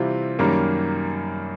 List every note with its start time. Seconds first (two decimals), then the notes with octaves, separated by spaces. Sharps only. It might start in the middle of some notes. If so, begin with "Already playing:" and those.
Already playing: C3 E3 G3 C4 F4
0.39 F#2 D#3 G3 A#3 C#4